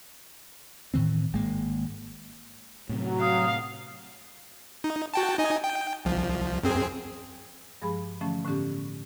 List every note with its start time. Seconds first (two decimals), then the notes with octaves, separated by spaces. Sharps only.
0.94 A2 D#3 E3 C4
1.33 G#1 G#3 A#3
2.89 A2 C3 F#3
3.21 F5 D#6
4.84 D#4
5.14 F#4 G5 A5
5.38 D#4 D#5 G#5
5.64 G5
6.05 C2 F3
6.63 F#2 C4 G#4
7.82 G2 F3 G#3 G#4 B5
8.21 D3 E3 F3 A3 C#4
8.45 A2 D3 B3 C#4 G4